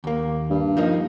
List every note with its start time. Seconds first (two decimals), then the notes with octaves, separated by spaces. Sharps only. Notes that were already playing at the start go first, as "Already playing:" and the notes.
0.04 D#2 A#3
0.50 G2
0.77 F3 A#3 D#4